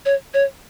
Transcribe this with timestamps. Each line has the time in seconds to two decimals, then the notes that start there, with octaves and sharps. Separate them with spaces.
0.06 C#5
0.34 C#5